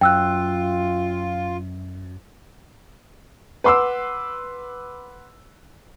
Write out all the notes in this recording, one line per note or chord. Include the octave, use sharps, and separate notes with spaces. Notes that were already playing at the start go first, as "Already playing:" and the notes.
F#2 F4 G5 E6 F#6
B4 F#5 C6 D6 E6